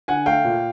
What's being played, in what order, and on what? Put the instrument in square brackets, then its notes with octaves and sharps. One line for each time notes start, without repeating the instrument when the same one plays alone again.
[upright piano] D3 F#5 G#5
A3 F5 G5
A#2